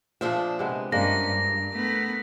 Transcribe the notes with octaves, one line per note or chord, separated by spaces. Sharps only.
A#2 F3 D4 G#4 C5 E5
C3 G#3 B3
G2 G#3 A#3 C#4 D4 A#6
G2
A3 B3